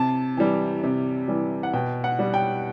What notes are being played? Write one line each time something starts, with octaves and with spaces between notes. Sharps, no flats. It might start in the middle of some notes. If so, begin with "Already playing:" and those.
Already playing: C3 A5
E3 G3
C3
E3 G3
F#5
B2 G5
F#5
G3
G5